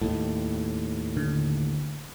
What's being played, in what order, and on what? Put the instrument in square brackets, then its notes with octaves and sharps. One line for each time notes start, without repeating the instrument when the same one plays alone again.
[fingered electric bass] D#2 A2
[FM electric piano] D3